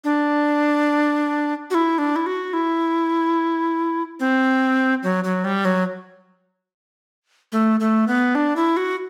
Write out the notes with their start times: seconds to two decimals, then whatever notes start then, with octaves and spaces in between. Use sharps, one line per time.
0.04 D4
1.71 F#4
1.74 E4
1.98 D4
2.16 E4
2.26 F#4
2.53 E4
4.20 C4
5.03 F#3
5.24 F#3
5.44 G3
5.65 F#3
7.52 A3
7.80 A3
8.08 B3
8.35 D4
8.56 E4
8.77 F#4